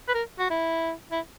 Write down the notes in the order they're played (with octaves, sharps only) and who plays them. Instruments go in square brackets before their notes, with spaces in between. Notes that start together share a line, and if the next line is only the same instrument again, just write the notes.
[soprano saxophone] B4
A#4
F#4
E4
E4